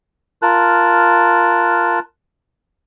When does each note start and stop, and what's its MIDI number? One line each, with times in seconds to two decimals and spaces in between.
0.42 1.99 65
0.42 1.99 70
0.42 1.99 81
0.42 1.99 90